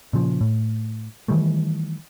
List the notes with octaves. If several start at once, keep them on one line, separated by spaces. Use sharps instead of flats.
A#2 C#3 F3
A2
D#3 E3 G3 A3